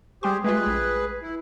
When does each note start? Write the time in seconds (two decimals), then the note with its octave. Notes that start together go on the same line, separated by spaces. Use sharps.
0.23 G3 G4 G#4 C5 G5 C6
0.44 G#3 A3 F4 G#4 B4
0.66 A#1
1.22 E4